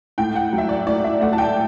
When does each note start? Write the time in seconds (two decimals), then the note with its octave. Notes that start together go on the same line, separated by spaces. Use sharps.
0.18 A2 G5
0.35 F#5
0.53 F#3
0.58 E5
0.69 D5
0.87 A2 D5
1.04 E5
1.21 A3 F#5
1.33 A5
1.38 G5